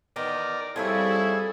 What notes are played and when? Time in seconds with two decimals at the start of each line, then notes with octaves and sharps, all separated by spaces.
0.16 E2 D#3 B3 A#4 D5
0.76 F2 F3 G3 E4 G#4 A4 C#5